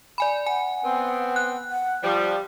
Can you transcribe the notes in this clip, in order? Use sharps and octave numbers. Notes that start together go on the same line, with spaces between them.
D5 G#5 B5
F#5 G#5
B3 C4
F#6
F#5
F3 G3 G4